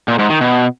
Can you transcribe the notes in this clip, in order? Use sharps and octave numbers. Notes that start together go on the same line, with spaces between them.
A#2
G#2
D#3
B2